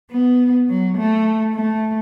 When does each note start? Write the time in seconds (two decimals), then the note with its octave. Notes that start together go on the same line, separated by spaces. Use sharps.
0.11 B3
0.69 F#3
0.98 A3
1.55 A3